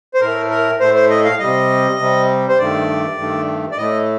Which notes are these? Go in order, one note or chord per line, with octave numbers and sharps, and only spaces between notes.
C5
A2 A3 A#4
A#4
A2 A3 C5
C5
D#5
F5
C3 G3 D#5
C3 G3
C5
G2 D#3 A3 D5
G2 D#3 A3
D5
A2 A3 D#5